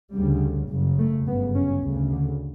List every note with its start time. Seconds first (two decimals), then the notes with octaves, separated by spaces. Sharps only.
0.13 D2 C#3 G3
0.70 F#1 F#2 C#3
0.98 A3
1.26 G1 F#2 C#3 B3
1.54 C#4
1.83 D2 C#3
2.11 D3